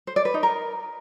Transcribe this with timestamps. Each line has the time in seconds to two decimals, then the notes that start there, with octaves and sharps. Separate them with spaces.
0.07 C5
0.16 D5
0.25 B4
0.34 D#4
0.43 A#4